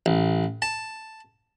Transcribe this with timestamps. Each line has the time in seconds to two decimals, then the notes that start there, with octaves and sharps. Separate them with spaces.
0.06 A1
0.62 A5